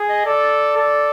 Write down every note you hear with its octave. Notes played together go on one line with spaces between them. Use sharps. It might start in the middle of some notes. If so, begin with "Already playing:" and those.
Already playing: G#4
D#5
A4 D5
A4